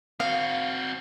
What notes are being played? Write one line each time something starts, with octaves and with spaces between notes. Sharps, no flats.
C4 F#4 F5